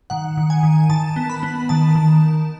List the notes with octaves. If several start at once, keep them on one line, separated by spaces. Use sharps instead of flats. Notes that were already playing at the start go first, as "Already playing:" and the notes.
D#3 F#5
D#3
G#5
D#3
D#3 A5
B3
B5
B3
D#3 A5
D#3